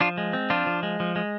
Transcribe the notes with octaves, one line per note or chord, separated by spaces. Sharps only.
F3 D4 F4
G#3
C4
F3 D4 F4
F3
G#3
F3
G#3